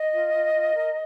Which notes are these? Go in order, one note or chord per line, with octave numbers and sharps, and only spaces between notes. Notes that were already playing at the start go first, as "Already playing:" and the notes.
Already playing: D#5
F4
F4
F4
A#4